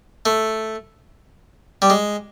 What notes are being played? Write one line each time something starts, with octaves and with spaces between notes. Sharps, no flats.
A3
G3
G#3